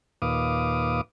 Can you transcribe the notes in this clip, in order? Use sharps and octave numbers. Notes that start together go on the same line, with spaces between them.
D#2 A#2 B4 F5 D6 D#6